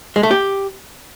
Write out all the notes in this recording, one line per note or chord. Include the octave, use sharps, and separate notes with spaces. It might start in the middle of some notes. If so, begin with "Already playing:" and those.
G#3
A3
G4